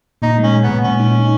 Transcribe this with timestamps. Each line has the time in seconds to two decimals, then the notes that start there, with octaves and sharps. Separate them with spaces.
0.22 A#2 D#4
0.38 G#3
0.44 C#4
0.53 G#3
0.64 B3
0.69 A#2
0.84 A#2 C#4
1.00 D#4
1.15 D#4